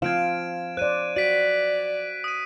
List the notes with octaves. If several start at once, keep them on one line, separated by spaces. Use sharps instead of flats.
F3 C4 F5 G#6 D7 E7
C5 D5 F#6 D#7
F#4 D5 B6 D7
D#6 D#7